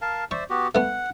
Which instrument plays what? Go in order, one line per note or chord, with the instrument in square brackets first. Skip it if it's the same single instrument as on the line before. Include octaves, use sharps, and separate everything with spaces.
[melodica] A#4 F5 A5
[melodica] C5 D5 E5 [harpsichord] C#6
[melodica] B3 F#4 G4
[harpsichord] A3 B3 [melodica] F#5